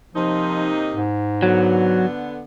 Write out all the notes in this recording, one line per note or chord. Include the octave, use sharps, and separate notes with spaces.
C3 F3 A#3 D#4
G#2
D3 F#3 B3